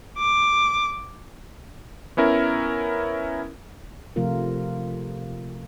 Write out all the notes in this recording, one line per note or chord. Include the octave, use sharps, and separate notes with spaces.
D6
B3 C#4 E4 A#4
C3 F3 A3 F4 A#4